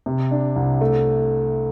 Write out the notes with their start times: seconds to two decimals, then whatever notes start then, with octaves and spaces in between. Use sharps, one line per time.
0.06 C3
0.31 D4
0.56 C2
0.81 A3